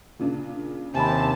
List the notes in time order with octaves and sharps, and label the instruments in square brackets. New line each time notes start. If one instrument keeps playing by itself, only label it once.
[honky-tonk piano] A#2 C#3 D4
[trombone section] D#2 C3 [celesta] G#5 B5 [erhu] A5